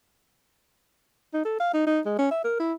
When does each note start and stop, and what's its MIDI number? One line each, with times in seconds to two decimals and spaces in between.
1.34 1.44 63
1.45 1.56 69
1.60 1.70 77
1.74 1.85 63
1.87 2.01 63
2.06 2.18 56
2.18 2.28 61
2.31 2.43 76
2.44 2.55 70
2.60 2.73 64